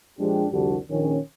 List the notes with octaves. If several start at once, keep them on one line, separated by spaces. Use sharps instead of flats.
A#1 F3 G#3 D4 G4
C2 F2 D3 G3 D4 F#4
A#1 D#3 C#4